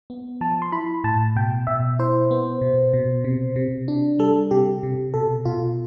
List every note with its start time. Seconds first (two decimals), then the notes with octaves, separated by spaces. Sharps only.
0.10 B3
0.41 F3 A5
0.62 C6
0.72 E4 B5
1.04 A2 A5
1.36 B2 G5
1.67 B2 E5
1.99 E4 C5
2.31 B3
2.61 B2
2.93 B2
3.24 C3
3.56 C3
3.88 D4
4.19 G3 A4
4.51 C3 G4
4.83 C3
5.14 B2 A4
5.45 B2 F4